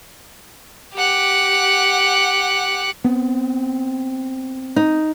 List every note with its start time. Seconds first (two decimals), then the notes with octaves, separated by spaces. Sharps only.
0.94 G4 F#5
3.04 B3 C4
4.76 D#4